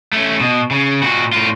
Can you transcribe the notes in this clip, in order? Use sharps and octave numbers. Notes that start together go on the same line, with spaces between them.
A3 C#4
B2
C#3
A#2 F#4
A2 F4